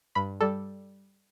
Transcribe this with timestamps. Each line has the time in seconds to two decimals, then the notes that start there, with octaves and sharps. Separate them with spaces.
0.15 G2 B5
0.41 G3 A4